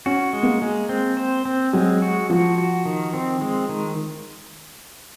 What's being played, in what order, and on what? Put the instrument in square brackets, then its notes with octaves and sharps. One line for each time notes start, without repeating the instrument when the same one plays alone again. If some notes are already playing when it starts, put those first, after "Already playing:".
[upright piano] C#4 [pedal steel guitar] F#4
[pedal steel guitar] G#3
[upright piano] A#3
[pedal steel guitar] G#3
C4
C5
C4
[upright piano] F#3 [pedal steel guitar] G#3
[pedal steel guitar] F#4
[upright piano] F3 [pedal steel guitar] F#4
[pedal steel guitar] F#4
D#3
C4
G#3
D#3